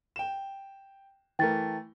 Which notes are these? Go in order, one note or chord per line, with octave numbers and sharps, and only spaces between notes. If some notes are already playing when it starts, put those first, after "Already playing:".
G5 E7
E3 A3 A#4 G5 A6